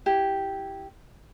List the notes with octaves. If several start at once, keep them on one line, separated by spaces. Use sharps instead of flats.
E4 G4